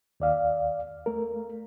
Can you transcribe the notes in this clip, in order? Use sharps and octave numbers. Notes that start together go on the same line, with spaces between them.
D#2 D5 F5
A3 A#4